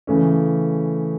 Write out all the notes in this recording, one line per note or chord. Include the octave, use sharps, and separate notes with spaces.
C#3 E3 A3 C#4